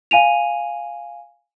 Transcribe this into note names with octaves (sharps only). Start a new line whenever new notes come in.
F5 G#5 D#7 F7